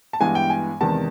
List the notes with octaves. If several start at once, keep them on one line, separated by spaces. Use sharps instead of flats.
A5
G2 E3 G#3 B3 G#5
G5
G#5
E2 C3 D#3 G#3 A5